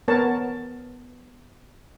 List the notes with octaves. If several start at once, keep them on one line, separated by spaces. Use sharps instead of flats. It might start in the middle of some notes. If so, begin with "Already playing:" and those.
B3 A#4 C#5 A5